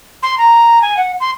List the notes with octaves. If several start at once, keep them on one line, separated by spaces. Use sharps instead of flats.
C6
A#5
G#5
F#5
C6